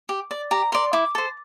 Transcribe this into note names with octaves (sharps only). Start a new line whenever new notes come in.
G4
D5
G4 A#5
A#4 D5 C6
E4 D6
A4 C5